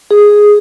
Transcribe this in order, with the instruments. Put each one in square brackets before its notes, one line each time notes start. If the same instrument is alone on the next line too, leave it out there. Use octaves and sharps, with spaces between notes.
[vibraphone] G#4